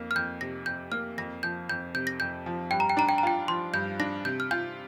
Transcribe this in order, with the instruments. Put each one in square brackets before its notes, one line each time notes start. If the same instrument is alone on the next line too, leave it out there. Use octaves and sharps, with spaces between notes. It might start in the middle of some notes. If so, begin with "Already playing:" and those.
Already playing: [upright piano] F2 A#3
[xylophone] F6
[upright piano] F2 [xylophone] G6
[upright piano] C3 [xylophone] A#6
[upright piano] F2 [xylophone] G6
[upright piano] A#3 [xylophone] F6
[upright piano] F2 [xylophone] A#6
[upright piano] F3 [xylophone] G6
[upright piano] F2 [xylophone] G6
[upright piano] C3 [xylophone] G6
[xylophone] A#6
[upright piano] F2 [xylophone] G6
[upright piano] F3
[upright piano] G2 [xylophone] G5
[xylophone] A#5
G5
[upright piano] D4 [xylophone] A#5
[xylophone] G5
A#5
[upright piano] F4 [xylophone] G5
[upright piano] F3 [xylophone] C6
[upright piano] G2 [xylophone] G6
[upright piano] D4 [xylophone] A#6
[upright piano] C3 [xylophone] G6
[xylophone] F6
[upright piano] F4 [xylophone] G6